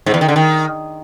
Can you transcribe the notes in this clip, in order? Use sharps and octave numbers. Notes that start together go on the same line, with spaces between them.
G#2
E2
D#3
D3
D#3